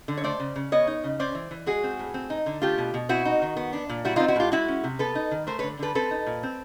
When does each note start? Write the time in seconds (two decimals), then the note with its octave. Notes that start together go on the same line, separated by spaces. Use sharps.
0.08 D3
0.17 C#5
0.24 A3 C5 D5
0.40 C#3
0.56 C#3
0.72 B3 C#5 D#5
0.87 D#4
1.04 C#3
1.19 C#4 C5 D5
1.35 E3
1.51 E3
1.66 G#3 F#4 G#4
1.83 C4
1.99 A2
2.14 C4
2.30 D#4
2.46 D3
2.62 A3 F4 G4
2.78 B2
2.94 B2
3.09 C4 E4 F#4
3.25 D#4
3.42 D#3
3.57 B3
3.73 D4
3.89 A#2
4.05 G3 E4 F#4
4.16 D#4 F4
4.20 C4
4.28 E4 F#4
4.36 A2 F4 G4
4.52 G#3 E4 F#4
4.68 C#4
4.84 C3
4.99 B3 A4 B4
5.15 D#4
5.31 D#3
5.47 A3 A#4 C5
5.59 D3 B4 C#5
5.79 D3 A4 B4
5.95 C4 A4 B4
6.11 D#4
6.27 A#2
6.43 C4